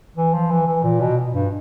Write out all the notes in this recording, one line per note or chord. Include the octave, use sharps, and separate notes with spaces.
E3
F3
E3
E3
A#2
B2
G2